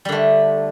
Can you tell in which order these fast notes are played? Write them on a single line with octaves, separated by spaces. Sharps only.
G3 D3 A3